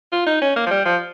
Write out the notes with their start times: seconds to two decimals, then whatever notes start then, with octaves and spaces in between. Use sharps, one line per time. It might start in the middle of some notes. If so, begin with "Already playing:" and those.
0.12 F4
0.27 D#4
0.42 C#4
0.56 A#3
0.66 F3
0.71 G3
0.86 F3